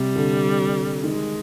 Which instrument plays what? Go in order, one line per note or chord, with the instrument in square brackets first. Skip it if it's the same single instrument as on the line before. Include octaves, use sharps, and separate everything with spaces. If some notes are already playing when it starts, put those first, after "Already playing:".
Already playing: [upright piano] C3 [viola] G3
[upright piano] D3
[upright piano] D#3 [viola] G#3